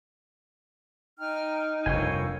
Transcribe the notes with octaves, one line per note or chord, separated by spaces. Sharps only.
D#4 G5 A#5 F6
F1 G2 A#4 C#5 F5 G5 G#5 E6